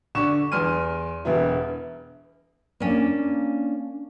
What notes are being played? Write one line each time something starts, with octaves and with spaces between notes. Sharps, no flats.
D3 C#6 E7
E2 C6 F6 D#7
E1 B3 E4
A#3 C#4 D4